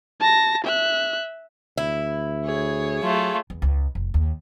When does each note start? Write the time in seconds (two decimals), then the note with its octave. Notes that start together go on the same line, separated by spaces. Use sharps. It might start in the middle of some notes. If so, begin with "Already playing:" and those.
0.20 A5 A#6
0.65 E5 F#6
1.78 D2 E4
2.44 G#4 C#5
3.03 F#3 A3 F4
3.50 E2
3.62 C#2
3.95 F1
4.14 D#2